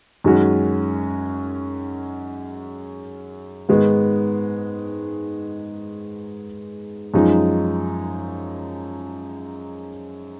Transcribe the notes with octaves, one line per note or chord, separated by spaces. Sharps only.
F#2 D#3 G#3 C#4 F#4
G#2 D#3 G#3 B3
F#2 F3 G#3 D#4